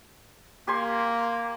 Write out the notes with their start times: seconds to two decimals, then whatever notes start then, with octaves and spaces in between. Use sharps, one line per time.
0.67 A#3 G4 G#5 C6